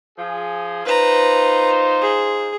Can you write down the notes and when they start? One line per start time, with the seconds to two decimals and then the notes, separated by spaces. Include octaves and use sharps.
0.18 F3 G#4
0.86 D#4 F4 B4 C5 A#5
2.01 G#4